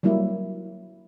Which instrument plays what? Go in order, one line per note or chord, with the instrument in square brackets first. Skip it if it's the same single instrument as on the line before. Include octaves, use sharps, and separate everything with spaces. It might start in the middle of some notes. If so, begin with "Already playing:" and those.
[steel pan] F#3 G3 A#3 E4